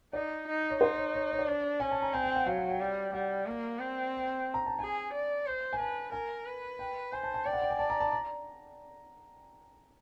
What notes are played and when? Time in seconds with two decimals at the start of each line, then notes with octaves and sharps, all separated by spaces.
0.13 D#4 D5
0.47 D#4
0.70 C#5
0.80 D#4 C5
0.97 C#5
1.14 C#5
1.32 C#5
1.39 D5
1.47 D4
1.80 C#4 G#5
1.91 A5
2.02 A#5
2.13 C4 G#5
2.24 G5
2.35 F#5
2.46 F#3 F5
2.58 F#5
2.69 G5
2.80 G3
3.13 G3 F#5
3.46 A#3
3.79 C4
4.54 A#5
4.66 A5
4.79 G#4 G#5
5.13 D5
5.46 C5
5.73 G#5
5.79 B4 A5
6.12 A#4 G#5
6.45 B4
6.79 G5
7.12 C5 G#5
7.23 A5
7.34 A5
7.45 D5 G5
7.53 F#5
7.62 G5
7.70 G#5
7.79 D5 A5
7.90 A#5
8.00 A5
8.12 A#5